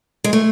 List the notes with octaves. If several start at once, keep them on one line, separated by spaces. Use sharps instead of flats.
G#3
A3